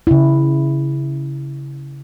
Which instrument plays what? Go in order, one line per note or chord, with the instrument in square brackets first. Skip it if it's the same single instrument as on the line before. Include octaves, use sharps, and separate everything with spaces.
[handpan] C#3 E4